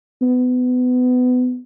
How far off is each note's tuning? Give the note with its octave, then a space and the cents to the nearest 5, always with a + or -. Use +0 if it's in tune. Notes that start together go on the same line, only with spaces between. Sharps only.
B3 +25